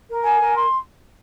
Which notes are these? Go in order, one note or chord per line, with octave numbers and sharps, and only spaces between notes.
A#4
G#5
A#4
C6